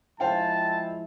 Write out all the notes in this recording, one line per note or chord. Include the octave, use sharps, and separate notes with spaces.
F3 G#3 E4 C5 F5 G5 A5